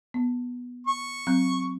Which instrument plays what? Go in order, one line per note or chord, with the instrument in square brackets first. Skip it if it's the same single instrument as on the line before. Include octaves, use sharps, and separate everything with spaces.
[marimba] B3
[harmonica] C#6
[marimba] F#3 C4 F#6